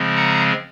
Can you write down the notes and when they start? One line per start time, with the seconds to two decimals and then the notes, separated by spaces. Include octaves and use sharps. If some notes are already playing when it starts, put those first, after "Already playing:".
Already playing: C#3 F3 G#3 C4
0.16 F#5 A#5